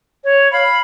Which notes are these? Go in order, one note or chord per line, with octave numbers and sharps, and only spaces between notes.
C#5
F5 B5